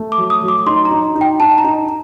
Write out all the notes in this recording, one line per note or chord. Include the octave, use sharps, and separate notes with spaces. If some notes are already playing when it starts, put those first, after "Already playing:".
Already playing: A3
D6
F#3
D#6
F#3
D6
D#4 C6
A#5
D#4
D#4
G5
D#4 A5
A#5
D#4